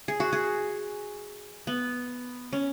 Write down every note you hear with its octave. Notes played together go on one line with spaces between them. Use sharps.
G#4
F#4
G#4
B3
C#4